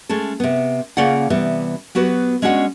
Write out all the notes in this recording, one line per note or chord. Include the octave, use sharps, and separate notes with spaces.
G#3 A3 C#4 A4
C3 B3
C#3 A#3 C#4 F4 D5 F#5
C3 E3 G3 B3
F#3 B3 F#4 G4 B4
G#3 C#4 D4 F#4 F#5